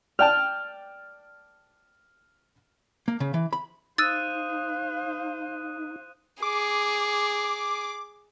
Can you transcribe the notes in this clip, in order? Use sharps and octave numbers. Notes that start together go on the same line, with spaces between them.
D5 G5 A5 F6
A#3
C#3
E3
B5
D#4 C5 F5 D#6 E6 F#6 A6 D#7
G#4 D6